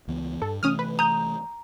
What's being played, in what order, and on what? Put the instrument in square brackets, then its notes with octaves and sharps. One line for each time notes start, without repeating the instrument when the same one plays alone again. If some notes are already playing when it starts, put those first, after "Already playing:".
[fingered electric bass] C#2 E3 B3
[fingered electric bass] G2 [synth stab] A4
[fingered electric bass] C3 E3 A3 [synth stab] C#4 D#6 F6
[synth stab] B4
[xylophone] A#5 [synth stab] D#6 G6